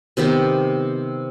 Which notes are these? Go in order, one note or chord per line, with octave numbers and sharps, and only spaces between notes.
C3 D#3 B3 G4